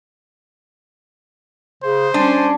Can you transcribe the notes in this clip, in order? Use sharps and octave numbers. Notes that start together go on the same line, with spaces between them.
C#3 C5
G3 C#4 D4 D5 G#5 C6